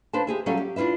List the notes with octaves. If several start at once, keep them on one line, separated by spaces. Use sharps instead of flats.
D4 B4 C5 F5 A5
G4 G#4 E5
F#3 G3 C#4 A4 E5 F5
G4
D4 E4 F4 B4 E5